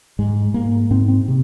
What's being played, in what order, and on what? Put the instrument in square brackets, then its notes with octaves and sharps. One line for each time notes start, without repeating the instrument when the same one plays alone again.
[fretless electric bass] G#2 G#3
G#2 A#3
G#2 C4
C4
C3